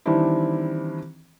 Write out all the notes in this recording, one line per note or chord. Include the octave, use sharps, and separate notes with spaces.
D#3 E3 G3 C4 D4 E4